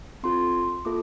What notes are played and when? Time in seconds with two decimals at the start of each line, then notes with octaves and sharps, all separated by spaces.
0.23 C4 F4 A4 C6
0.85 A#3 F4 A4 D6